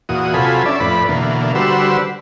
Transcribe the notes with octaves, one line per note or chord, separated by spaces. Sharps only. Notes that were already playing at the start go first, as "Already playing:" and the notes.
E2 A#2 F#4 D#6
C3 F#3 F4 A4 G#5 B5
C#4 D4 D5 E5
F2 A2 B4 D5 B5
B2 D3 E3 A#3
D3 G3 F#4 B4 C5 E6